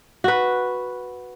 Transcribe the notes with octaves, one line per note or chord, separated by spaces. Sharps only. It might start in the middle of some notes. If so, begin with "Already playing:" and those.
F#4 B4